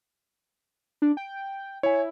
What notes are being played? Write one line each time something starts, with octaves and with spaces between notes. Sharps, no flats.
D4
G5
E4 C#5 G#5